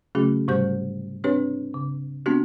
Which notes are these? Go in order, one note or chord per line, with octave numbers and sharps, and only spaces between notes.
C#3 F#3 A3 C#4 F#4 G#4
G#2 C3 G3 G4 C5 G6
C4 D4 G4 B4 C#5
C#3
G#3 B3 C4 D4 F#4 G4